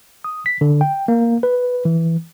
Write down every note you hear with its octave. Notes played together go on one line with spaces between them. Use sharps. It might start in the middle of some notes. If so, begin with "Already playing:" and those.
D#6
B6
D3
G5
A#3
B4
E3